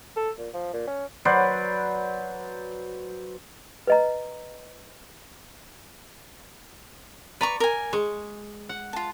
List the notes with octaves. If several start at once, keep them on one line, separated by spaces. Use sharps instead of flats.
A4
A#2
F3
A#2
C#4
F#3 B4 C5 D5
B4 D#5 A#5
B4 D5 A#5 C#6
A#4 G#5
G#3 C#6
F#5
F4 A5